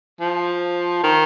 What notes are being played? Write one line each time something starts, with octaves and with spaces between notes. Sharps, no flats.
F3
D#3